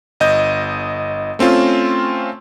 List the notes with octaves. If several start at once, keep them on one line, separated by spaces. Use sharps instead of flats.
G1 D#5 G6
A3 C4 C#4 F4